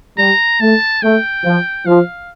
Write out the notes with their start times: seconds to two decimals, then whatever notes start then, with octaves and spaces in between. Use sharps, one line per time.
0.18 G3 A#5
0.60 A3 A5
1.02 A3 G5
1.44 F3
1.86 F3 F5